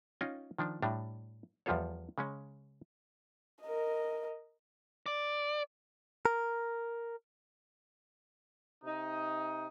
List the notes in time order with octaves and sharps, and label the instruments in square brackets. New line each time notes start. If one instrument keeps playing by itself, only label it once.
[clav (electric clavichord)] C#4 D#4 F4 D#5 G5
D#3 F3 D4
A2 G3 D4 A#5
E2 F3 G3 F4 A4 C#5
C#3 G#3 C#4
[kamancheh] A#4 D#5
[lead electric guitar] D5
[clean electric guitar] A#4
[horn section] C3 D#4